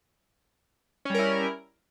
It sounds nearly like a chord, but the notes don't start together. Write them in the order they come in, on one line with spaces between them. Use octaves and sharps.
C#4 G3 A#4 E4